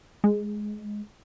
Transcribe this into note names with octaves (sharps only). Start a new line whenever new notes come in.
G#3